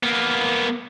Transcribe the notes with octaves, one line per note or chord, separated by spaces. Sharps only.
A#3 B3